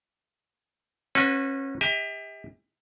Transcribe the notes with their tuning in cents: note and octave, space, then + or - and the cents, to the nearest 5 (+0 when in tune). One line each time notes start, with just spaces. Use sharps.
C#4 -30 F#4 -25 B4 +0
G4 +35 E5 -45